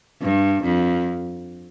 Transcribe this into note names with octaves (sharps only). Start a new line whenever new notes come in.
G2
F2